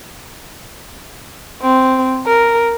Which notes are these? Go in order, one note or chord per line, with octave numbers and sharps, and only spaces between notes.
C4
A#4